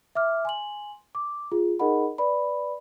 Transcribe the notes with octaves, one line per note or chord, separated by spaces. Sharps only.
E5 D6 F6
G#5 C6 F#7
D6
F4 G#4
D#4 G#4 A#4 D#5 F#5 B5
B4 D5 B5